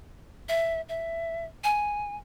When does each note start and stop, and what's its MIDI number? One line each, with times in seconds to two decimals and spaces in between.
0.49 0.81 76
0.89 1.45 76
1.64 2.16 80